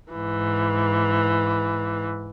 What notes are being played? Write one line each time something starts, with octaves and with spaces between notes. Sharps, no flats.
G#2 E3